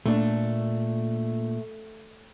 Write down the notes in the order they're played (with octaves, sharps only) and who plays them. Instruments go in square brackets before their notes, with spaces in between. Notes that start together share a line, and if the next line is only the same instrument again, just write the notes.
[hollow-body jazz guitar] A#2 D4 [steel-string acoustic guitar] A3